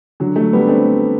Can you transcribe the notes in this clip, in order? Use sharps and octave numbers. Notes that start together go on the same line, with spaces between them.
D3 F#3
F#3 A3
G3 B3
D4
A3 C4